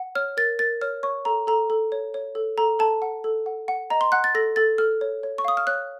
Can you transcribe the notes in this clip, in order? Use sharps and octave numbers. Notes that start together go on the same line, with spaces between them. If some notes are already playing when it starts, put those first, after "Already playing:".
Already playing: F#5
C#5 F6
A#4 A6
A#4 A6
C#5 F6
C#5 C#6
A4 A#5
A4 A#5
A4
C#5
C#5
A4
A4 A#5
A4 A5
F#5
A4
F#5
F#5
D#5 A#5
C6
F#5 F#6
A6
A4 A#6
A4 A6
A4 F6
C#5
C#5
C#6
F5 D#6
F6
C#5 F#6